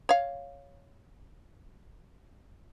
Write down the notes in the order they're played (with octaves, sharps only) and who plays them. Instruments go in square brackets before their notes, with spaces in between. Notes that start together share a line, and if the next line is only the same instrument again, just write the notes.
[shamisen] C#5 F5